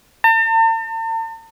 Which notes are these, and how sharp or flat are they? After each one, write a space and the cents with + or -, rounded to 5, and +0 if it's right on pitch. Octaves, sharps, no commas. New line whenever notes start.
A5 +45